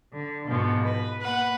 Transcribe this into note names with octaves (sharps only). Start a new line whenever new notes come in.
D3
G#2 B2 F3
B4
A#3 B4 F#5